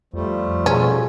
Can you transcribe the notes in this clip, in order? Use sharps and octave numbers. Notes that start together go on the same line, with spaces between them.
F2 F3 G3 A3
B2 C#4 G#4